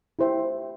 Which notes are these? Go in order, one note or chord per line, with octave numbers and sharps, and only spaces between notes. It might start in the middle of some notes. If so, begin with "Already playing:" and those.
E4 G4 C5 E5 G5